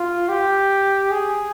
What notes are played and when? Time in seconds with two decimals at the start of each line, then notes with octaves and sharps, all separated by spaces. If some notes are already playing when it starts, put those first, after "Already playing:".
Already playing: F4
0.29 G4
1.11 G#4